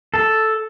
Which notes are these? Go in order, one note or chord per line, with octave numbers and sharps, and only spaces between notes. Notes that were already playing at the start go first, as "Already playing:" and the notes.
A4